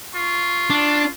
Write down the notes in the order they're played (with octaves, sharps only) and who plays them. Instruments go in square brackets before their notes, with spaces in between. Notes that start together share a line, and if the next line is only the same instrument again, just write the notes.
[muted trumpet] F4 [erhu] C#6
[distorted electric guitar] D4